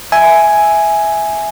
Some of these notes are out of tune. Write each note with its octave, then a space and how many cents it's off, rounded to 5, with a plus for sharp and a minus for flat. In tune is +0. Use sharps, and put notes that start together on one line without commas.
E5 +0 G#5 +5